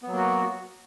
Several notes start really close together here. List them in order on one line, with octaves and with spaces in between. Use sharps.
B3 F#3 A#3 F#4